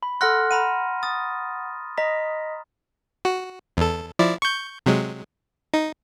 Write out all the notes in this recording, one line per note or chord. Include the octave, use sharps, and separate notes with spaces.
B5
A4 F#5 C6 F6 F#6 A#6
F#5 A#5 B5 D#7
D#6 A6
D#5 A#5 B6
F#4
E2 A4
F3 E4 D5
C#6 G6
C3 F#3 G#3
D#4